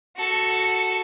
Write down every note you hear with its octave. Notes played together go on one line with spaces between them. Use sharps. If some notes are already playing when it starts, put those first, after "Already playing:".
F#4 A4